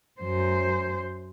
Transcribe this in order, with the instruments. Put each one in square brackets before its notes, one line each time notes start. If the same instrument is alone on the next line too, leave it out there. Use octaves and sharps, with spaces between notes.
[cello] F#2 C5